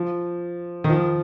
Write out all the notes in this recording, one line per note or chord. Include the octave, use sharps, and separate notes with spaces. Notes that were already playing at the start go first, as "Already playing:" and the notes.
Already playing: F3
D#3
F3